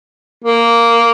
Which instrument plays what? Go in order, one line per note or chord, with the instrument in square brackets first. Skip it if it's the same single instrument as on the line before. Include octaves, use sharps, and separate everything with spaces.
[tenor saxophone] A#3